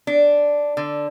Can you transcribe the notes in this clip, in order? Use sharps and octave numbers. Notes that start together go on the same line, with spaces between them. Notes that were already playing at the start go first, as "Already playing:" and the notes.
D4
D3